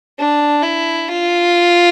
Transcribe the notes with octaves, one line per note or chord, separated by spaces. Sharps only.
D4
E4
F4